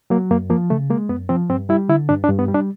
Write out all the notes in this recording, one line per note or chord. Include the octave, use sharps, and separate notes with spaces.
F#3 A#3
F#2 A#3
F3 A#3
C#3 A3
G#3 A#3
F#2 B3
F3 C4
G2 C4
G3 E4
D3 E4
G2 D4
D4
G2
B3
G3
D4